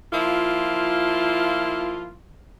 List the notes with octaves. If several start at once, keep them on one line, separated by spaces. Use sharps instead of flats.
F3 A#3 E4 F4